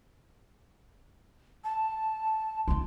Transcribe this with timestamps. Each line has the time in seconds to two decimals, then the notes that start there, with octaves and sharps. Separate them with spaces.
1.64 A5
2.68 D#4 F4 C6